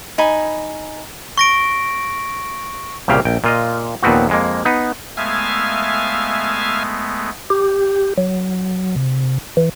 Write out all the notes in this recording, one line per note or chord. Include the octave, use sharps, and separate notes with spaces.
D#4 G#5 B5
C#6 A#6 D7
C2 A#2 C#3 G4 F5
A#1 G5
A#2 F4 D#5
D#2 A#2 F3 B3 C4 F#4
F2 G#3 A#3
B3 D#4
G#3 A3 B3 E5 F5 G#5
G4
F#3
C3
E3